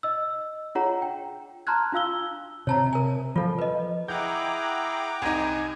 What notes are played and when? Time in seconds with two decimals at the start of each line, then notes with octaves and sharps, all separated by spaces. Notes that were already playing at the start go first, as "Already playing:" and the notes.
0.03 D#5 E6
0.75 D4 F4 G#4 C#5 F#5 A#5
1.02 G5
1.67 A5 A#5 C6 F6 F#6 G#6
1.92 D4 F4 F5 E6 G7
2.67 C3 C#5 A5 A#5
2.93 A#4 G#5
3.36 F3 F4 A4
3.59 B4 D#5
4.08 E4 G#4 F#5 G5 A#5 D6 G6
5.22 C2 D#4 G#5